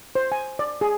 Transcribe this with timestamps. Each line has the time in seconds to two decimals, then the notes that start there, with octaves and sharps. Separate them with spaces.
0.15 C5
0.32 G#5
0.59 D5
0.81 G#4